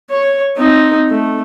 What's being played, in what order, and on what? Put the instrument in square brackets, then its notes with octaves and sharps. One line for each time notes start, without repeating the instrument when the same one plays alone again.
[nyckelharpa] C#5
C4 D#4
A3